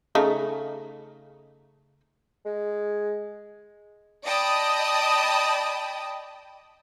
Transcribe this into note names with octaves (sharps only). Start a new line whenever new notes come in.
C#3 A3 D#4
G#3
D5 D#5 G5 A5 B5 D#6